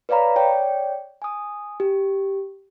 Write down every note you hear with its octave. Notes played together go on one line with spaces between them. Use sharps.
B4 C#5 D5 F5 A#5 B5
C#5 D5 G5
G#5 D#6
G4